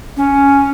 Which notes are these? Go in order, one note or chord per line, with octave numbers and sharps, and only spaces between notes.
C#4